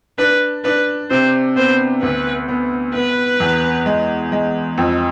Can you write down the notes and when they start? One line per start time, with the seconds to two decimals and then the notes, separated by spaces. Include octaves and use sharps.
0.18 D4 B4
0.65 D4 B4
1.10 C3 C5
1.56 B3 C5
2.02 D2 B4
2.48 B3
2.94 B3 B4
3.40 E2
3.86 G#3
4.32 G#3
4.78 F2